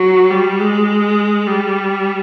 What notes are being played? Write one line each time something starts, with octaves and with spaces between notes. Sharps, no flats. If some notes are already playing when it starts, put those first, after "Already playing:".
Already playing: F#3
G3
G#3
G3